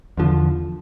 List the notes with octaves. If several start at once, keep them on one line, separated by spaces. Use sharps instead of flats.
E2 D3 F3